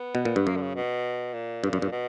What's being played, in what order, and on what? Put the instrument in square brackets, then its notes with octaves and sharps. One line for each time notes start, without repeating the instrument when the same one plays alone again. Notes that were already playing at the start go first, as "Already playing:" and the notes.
Already playing: [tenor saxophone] B3
[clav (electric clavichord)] B2
A#2
G2
[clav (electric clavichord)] F#2 [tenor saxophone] A#3
[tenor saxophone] D3
C#3
B2
A#2
[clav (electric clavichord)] G2
F#2
G2
[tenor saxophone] B2